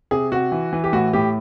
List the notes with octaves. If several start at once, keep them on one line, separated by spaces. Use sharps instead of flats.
C3 G#4
C3 F#4
E3
E3
G4
A2 F#4
A2 G4